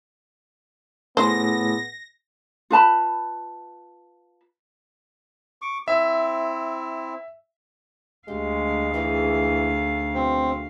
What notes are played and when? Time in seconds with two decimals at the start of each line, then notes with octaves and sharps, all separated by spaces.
1.17 A2 B3 G#4 C5 A#6
2.70 F4 B4 A5 B5
5.62 C#6 D6
5.88 C4 E4 E5
8.28 D2 G#3 G4 F5
8.94 E3 G#3 D#4 G#4
10.15 B2 C4